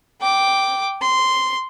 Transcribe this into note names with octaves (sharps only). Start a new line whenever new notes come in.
G5 D6
C6